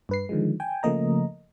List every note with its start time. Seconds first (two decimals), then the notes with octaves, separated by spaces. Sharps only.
0.09 G2 B4 C7
0.29 D3 D#3 F3 G#3
0.60 G5 G#5
0.83 C#3 F3 A3 A#3 D#5 A#5